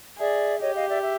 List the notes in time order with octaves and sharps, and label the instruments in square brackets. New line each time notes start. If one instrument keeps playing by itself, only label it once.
[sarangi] G#4 [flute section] D5 E5
[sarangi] G4 [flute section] C#5 D#5
[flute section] D#5 F5
D5 E5
E5